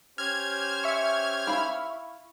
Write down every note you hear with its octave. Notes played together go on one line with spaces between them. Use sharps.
C#4 G4 C5 F6 G#6
E5 C#6
E4 F5 B5